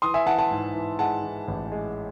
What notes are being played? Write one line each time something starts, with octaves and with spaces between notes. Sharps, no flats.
E3 C6 D#6
E5 G#5
E3 F#5 A5
F#5 A5
G#2
E3
G#3 F#5 A5
E3
A1
G#3